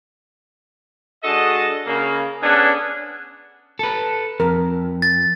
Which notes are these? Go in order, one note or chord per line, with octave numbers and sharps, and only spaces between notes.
G#3 D4 F#4 A4 D#5
C#3 A#3
B3 C#4 D4 G#4 A4 F#5
A4 B4
F2 A#4
A6